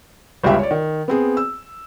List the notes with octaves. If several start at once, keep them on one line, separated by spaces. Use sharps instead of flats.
G1 C#2 C#3 G4 E5
C#5 D5
D#3
B3 C4 G#4
E6